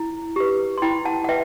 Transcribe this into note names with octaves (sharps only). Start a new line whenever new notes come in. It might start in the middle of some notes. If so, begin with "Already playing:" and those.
Already playing: E4
G4 B4
C6
E4 G5 B5
F#5 A5
F#5
B4 E5 G5